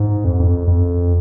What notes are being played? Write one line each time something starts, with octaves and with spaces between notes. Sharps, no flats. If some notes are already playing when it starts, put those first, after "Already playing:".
Already playing: G#2
F2
F2
F2